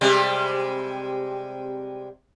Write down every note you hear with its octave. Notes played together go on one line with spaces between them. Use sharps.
C3 G3 G#3